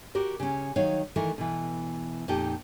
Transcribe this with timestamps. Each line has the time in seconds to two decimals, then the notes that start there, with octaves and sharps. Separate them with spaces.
0.15 F#4 G4 A#4
0.40 C#3 C#4
0.76 D#3 F#3 D#4 C#5 F5
1.16 D#3 E3 A3 A#4
1.38 B2 E3
2.28 F2 A#2 D#4 G4 G5 A5